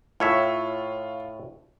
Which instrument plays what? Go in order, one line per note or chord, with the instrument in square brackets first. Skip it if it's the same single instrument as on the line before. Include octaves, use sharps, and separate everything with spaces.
[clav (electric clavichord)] A2 C#5 E5 [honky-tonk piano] F4